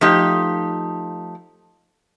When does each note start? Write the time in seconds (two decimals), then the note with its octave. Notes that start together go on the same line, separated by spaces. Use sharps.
0.01 F3 A3 D#4 G4